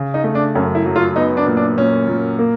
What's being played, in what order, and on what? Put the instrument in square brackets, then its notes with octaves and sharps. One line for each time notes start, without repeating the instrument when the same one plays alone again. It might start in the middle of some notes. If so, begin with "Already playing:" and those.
Already playing: [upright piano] C#3
[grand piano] D#4
[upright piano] A3
[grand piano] D4
[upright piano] F#2 [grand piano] C#4
[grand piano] E4
[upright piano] F#3
[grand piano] F4
[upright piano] B3 [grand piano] D#4
[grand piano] D4
[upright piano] A#2
[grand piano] D4
[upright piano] A#2 [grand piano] C#4
[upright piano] A#2
A#3